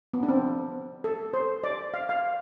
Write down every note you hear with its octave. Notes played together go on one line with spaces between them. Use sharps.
B3
D4
C4
A4
C5
D5
F5
F5